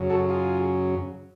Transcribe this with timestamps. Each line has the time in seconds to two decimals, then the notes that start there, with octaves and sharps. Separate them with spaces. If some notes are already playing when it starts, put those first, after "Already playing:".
Already playing: F#2 C#3 F#3
0.10 F#4 A4
0.29 F4 G#4